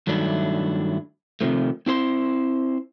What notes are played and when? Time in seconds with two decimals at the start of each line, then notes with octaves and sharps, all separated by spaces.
0.07 G2 D#3 F#3 A3 D4 E4
1.41 C3 D#3 F3 A3
1.86 C4 E4 C5 C6